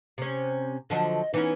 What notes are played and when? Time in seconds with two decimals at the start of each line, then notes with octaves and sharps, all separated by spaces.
0.18 C3 C#4
0.90 D3 F3 F#3 D#5
1.34 E3 B3 C#4 D#4